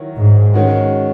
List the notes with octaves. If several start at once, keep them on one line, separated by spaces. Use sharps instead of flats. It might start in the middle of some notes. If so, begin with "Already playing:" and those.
Already playing: D#3 F#3 E4
G#2
D#3 G#3 C#4 F#4